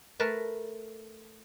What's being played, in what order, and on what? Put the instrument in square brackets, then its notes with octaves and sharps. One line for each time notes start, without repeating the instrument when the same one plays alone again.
[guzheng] A3 A#4 B4 A5